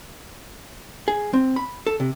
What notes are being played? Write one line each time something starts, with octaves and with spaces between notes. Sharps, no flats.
G#4
C4
B5
A4
C3